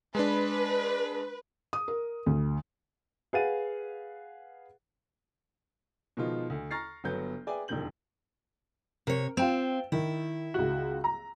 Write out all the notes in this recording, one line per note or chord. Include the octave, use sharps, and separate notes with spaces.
G#3 D4 B4
D#6
A#4
D2
G#4 B4 F5 F#5 A6 D#7
B2 D#3 F3 G#3 F4
D2
A#5 C#6 F6 A6 A#6 C7
G1 F#3 B3 G6
G#4 B4 D5 E5 G5 G#5
E1 F2 D3 D#3 G6 F#7
C3 A#4 C#5
C4 F4 G5 E7
D#3 E4
C#2 F#4
A#5